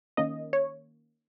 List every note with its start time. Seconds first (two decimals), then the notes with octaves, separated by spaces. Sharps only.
0.17 D#3 A#3 C#4 D#5
0.53 C#5